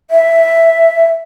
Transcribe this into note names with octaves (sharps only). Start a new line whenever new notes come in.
E5